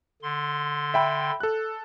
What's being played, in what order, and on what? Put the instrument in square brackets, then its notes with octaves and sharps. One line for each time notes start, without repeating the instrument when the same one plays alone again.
[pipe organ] D3 C6
[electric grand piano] E5 G5 B5
A4 F#6